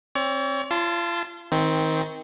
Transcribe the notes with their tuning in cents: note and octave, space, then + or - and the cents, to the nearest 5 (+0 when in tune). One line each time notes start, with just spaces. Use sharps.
C4 +30 C#5 +45
F4 -35 A5 +0 C6 +0
D#3 +25 C4 +0